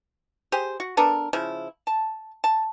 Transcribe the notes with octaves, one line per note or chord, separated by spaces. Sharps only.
G4 G#4 C5
F#4
B3 D4 A4 A#4
C#3 F3 E4
A5
A5